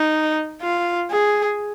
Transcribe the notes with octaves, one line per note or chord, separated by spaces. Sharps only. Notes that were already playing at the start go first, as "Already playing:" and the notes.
Already playing: D#4
F4
G#4